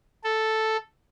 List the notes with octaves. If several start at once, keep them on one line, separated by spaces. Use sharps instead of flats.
A4